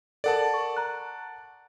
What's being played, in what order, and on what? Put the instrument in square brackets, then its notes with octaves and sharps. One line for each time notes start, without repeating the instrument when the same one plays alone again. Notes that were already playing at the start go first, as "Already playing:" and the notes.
[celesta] A4 A#4 [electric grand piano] D5 F#5 A5
[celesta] C#6
A#5 F#6